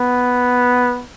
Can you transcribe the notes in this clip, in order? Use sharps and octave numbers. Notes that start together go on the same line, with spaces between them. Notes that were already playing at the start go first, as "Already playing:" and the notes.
Already playing: B3